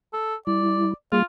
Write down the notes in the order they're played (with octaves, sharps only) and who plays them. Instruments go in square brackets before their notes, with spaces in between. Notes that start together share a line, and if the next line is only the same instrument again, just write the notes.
[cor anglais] A4
[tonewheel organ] G3 E4 [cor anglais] D5
[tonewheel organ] G3 A#3 G#4 [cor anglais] F4